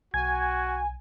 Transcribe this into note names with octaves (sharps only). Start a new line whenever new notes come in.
B1 F#4 G#5 G#6